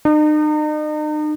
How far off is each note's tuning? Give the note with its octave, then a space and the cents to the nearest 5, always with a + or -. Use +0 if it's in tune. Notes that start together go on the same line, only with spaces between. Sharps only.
D#4 -40